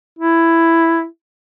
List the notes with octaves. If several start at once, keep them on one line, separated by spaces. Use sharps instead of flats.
E4